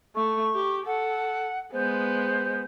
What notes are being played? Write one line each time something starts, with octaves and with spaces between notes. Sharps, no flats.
A3 C#6
G4
A4 F#5
G#3 B3 C5